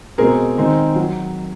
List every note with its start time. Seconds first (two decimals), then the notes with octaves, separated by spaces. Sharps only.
0.18 B2 G#3 C4 G#4 A#4
0.58 D#3 G#3 C4 D#4
0.96 F#3